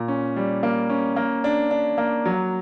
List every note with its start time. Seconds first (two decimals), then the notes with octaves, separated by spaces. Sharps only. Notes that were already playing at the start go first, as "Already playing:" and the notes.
Already playing: A#2
0.08 C#4
0.36 G3
0.63 A#3
0.90 C#4
1.16 A#3
1.44 D4
1.71 D4
1.98 A#3
2.26 F#3